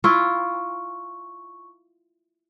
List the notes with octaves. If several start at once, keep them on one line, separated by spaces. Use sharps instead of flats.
E4 F4 C#6